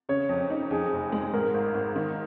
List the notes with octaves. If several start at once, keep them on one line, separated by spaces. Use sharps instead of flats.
C#3 C#5
F2
D#4
F2 G#4
F1
G#3
G#2 A#4
G#1
G#1
D#3